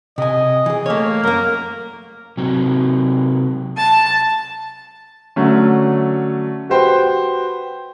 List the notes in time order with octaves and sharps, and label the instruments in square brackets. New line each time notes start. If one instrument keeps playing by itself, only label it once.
[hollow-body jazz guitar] C3 G#5 [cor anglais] D#5
[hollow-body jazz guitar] E3 G#4
[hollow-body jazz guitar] A3 C#5 [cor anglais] A#3
[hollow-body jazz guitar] F#2 A#3 [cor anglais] A#4
[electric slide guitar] C3 F#3
[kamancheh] A5
[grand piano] D3 F#3 A3 C#4
F#4 G4 B4 C5 G5